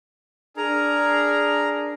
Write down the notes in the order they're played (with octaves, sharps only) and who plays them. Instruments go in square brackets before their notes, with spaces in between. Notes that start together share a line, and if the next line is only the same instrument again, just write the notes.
[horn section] D4 G#4 [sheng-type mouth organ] A#4 A#5